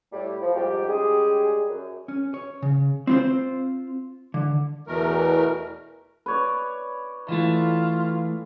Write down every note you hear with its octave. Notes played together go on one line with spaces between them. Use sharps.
A2 G3
F3
F2 G#2 F3 G3 A3 G4
G3 G#3 C#4 G4 G#4
F#2
C#4
C#5
C#3
C4 F4 C5
D3
E2 B2 E3 A3 A#4
B4 C#5 D5
E3 A3 F4